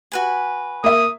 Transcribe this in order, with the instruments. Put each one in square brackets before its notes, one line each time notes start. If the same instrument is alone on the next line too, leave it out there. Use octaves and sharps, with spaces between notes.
[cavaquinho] F#4 B4 G#5
[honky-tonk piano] A#3 E5 [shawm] D#6